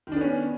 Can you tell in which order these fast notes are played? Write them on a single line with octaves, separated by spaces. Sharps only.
D#3 D4 B3 C#4